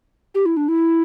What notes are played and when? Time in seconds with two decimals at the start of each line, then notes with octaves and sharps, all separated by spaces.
0.35 G4
0.46 E4
0.57 D4
0.68 E4